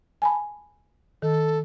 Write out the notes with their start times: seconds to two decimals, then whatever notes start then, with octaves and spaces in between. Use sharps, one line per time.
0.22 G#5 A5 B5
1.22 D#3 A4